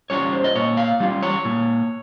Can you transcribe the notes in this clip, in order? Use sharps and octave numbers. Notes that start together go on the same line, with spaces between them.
G3 C#4 F4 C#5
C5
D#5
A#2 C#5
F5
G3 C#4 F4
C#5
A#2